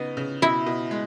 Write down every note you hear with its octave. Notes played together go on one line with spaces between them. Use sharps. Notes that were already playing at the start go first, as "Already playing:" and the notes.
Already playing: C#3 B3 D#4
C#3
B2 E4
B2
G#3